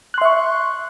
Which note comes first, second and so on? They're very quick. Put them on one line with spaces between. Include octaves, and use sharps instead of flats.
F#6 C6 E5 C#6